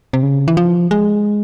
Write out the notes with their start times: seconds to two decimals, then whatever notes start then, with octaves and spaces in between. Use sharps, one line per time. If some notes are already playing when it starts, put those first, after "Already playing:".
0.13 C3
0.23 C#3
0.48 E3
0.57 F3
0.91 G#3